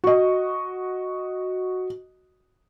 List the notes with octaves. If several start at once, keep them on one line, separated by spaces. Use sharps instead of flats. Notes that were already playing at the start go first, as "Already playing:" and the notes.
F#4 D#5